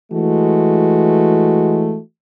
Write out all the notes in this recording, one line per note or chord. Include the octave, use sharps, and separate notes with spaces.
E3 G#3 A3 F#4